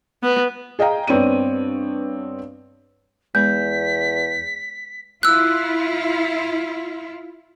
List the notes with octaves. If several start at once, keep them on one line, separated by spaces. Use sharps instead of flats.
B3
G#4 D#5 F5 G5 A#5
G2 B3 C4 C#5 D5 D#7
E2 G#3 B3 G6 B6
E4 F4 E6 F#6